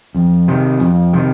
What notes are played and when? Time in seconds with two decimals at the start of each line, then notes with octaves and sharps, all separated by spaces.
0.15 F2
0.48 C3 D#3
0.80 F2
1.13 C3 D#3